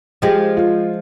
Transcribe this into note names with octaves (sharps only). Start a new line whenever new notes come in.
F3 G#3 G4
F4